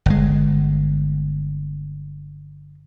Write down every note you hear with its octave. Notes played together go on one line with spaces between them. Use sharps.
G1 G#3